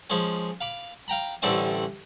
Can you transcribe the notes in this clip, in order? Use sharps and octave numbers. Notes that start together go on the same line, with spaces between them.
F3 G#3 C#4
F5 B5 D6
F5 G5 A#5 B5
A1 D3 G3 C4 C#4 E5